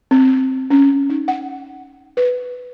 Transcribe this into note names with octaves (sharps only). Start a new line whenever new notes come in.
C4
C#4
D#4
F#5
B4